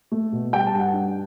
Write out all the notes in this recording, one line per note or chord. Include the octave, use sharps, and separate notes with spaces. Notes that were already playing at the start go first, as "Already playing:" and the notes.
A3
B2
G3 G5
A5
G2
F#5
D4